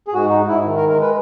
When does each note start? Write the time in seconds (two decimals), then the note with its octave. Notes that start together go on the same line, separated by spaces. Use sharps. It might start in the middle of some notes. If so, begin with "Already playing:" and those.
0.08 G#4
0.13 G#2 F#4
0.30 D#4
0.39 G#2
0.48 E4
0.64 D#3
0.76 A#4
0.89 G#3 A#4
1.02 B4